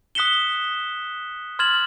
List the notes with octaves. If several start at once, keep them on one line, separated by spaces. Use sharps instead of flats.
D#6 F#6 B6 C#7 E7 G7
C6 F6 G#6 A6 E7 F#7